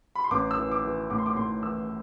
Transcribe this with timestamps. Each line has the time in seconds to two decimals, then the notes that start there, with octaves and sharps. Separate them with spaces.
0.15 B5
0.24 C6
0.31 A1 D6
0.51 E6
0.57 E3
0.72 D6
0.84 E3
1.10 A2 D6
1.18 C6
1.26 D6
1.36 A2 C6
1.63 E3 E6